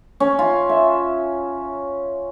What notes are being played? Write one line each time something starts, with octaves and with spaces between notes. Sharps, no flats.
C#4
F4
E5